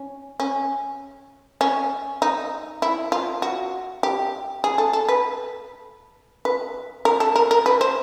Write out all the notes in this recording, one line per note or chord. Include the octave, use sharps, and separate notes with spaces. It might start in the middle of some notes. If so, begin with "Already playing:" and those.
Already playing: C#4
C#4
C#4
D#4
E4
F4
F#4
G4
G#4
A4
A4
B4
B4
A#4
A4
A#4
A#4
B4
C5